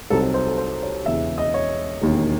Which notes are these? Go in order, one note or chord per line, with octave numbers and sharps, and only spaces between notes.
C2 C3 F#3 C4 D#4 A4
A4
C5
A4
C5
C#5
E1 E2 C#3 E3 E5
D#5
C#5
E1 D#2 D#3